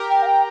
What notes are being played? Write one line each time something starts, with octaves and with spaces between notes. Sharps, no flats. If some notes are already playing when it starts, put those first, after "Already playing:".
Already playing: G4 A#4
G5
F5
G5